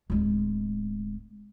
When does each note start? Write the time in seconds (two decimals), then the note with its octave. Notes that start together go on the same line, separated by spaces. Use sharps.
0.10 D1 G#3